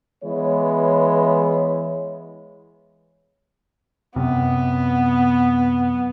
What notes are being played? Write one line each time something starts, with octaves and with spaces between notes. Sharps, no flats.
E3 G#3 B3 E4 C#5
F#2 C3 B3